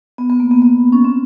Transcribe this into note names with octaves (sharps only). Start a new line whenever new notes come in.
B3
B3
A#3
B3
B3
C#4
C4